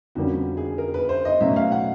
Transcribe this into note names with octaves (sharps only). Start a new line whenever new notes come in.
F2 D3 G3 A#3 C#4 F#4
G#4
A#4
B4
C5
D#5
B2 F#3 A3 C#4 E5
F5
F#5